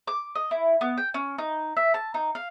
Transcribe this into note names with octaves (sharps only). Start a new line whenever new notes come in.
D6
D#5
E4
B3
G5
C#4
D#4
E5
A5
D#4
F5